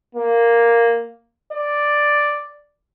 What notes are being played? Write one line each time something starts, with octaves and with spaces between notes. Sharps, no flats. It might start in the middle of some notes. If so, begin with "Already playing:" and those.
A#3
D5